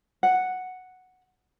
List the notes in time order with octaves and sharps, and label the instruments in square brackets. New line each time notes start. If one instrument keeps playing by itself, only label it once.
[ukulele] F#5